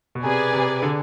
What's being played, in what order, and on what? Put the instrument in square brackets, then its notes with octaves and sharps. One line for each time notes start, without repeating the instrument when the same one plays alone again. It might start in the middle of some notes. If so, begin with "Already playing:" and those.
[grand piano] B2
[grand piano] C3 [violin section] G#4 B4 D5 G#5
[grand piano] C3
D3